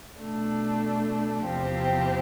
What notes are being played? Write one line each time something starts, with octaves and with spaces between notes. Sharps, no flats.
B2 A3 D4
E2 C3 F3 C4 G4